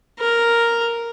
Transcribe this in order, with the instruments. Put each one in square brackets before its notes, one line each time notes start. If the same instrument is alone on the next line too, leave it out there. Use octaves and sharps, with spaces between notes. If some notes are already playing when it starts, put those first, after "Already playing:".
[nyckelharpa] A#4